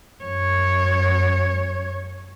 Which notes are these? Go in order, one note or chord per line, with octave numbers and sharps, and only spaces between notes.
F#2 C#5